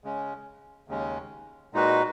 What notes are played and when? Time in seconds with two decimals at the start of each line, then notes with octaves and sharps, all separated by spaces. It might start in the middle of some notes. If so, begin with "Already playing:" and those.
0.04 C#3 G#3 C#4
0.88 D#2 C#3 G#3 C#4
1.73 A#2 G#3 D#4 F#4 B4